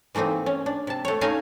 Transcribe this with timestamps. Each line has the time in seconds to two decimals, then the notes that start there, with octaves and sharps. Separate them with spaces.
0.15 E3 A3 A#3 C4 D#4
0.46 C#4
0.66 D4
0.87 C3 A5
1.05 A3 C#5
1.21 A3 C#4 D#4 D#5 F5 G#5